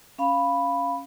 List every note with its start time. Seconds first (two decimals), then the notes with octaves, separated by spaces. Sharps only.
0.18 C#4 F5 B5